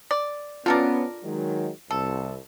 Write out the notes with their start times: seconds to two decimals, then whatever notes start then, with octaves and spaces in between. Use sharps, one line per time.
0.11 D5
0.66 B3 C#4 D4 F4 A4 A#4 D5
1.24 D#3 F#3 G#3
1.91 C2 A4